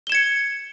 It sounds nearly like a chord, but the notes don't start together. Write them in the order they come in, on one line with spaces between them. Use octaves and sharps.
G7 E7 G#6 C#7